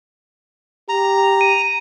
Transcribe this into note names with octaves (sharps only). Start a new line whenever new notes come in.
G4 A#5
D#7